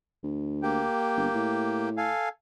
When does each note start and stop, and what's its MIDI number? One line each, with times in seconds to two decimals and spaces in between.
0.23 0.84 38
0.63 1.89 58
0.63 1.89 67
0.63 1.89 79
1.17 1.28 31
1.34 2.11 45
1.97 2.29 69
1.97 2.29 77
1.97 2.29 80